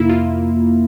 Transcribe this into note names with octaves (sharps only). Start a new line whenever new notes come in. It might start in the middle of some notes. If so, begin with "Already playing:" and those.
Already playing: F2 C3 A#3 E4
F4